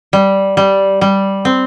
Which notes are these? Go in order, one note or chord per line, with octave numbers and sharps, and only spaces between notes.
G3
G3
G3
C4